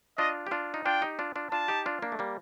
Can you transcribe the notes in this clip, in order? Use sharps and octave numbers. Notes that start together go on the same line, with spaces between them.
D4 F4 D#5
G4
D4 F4
D#4
D4 F4 G5
D#4 G4
D4 F4
D4 F4
D4 F4 A5
D#4 G4
D4 F4
A#3 D4
A3
G3 A#3